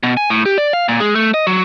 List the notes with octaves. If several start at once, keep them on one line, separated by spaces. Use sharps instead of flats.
B2
G#5
A2
G4
D5
F5
A#2
G#3
A3
D#5
F#3